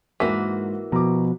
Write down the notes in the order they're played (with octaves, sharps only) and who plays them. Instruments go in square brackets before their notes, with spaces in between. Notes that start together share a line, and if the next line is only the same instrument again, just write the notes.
[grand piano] G#2 B6 [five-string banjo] E3 A#3 F#4
[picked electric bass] B2 [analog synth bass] F3 [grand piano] A#5 D6